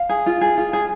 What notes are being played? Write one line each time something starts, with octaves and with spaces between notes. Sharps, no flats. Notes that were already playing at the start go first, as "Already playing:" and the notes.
Already playing: F5
G#4
F4
G#4
F4
G#4